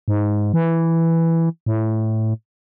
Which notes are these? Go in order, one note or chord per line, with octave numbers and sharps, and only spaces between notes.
G#2
E3
A2